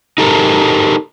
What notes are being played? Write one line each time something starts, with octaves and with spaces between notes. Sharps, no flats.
D#4 G4 A4 A#4